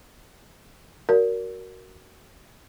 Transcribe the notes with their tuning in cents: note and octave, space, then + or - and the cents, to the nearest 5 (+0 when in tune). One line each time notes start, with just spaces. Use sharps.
F#4 +15 A#4 +0 D5 -40